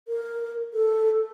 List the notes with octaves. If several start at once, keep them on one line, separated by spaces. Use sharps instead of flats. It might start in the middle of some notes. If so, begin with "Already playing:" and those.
A#4
A4